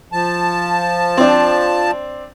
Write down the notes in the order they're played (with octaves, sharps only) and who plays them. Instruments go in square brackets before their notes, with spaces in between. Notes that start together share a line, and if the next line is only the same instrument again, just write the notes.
[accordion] F3 A5
[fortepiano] C4 D4